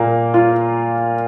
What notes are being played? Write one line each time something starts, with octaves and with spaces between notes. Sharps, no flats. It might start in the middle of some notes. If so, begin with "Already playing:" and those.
Already playing: A#2 A#3
F4